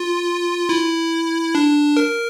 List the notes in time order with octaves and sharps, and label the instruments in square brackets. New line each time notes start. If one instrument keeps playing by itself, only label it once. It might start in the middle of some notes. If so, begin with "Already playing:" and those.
Already playing: [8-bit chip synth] F4
E4
D4
A#4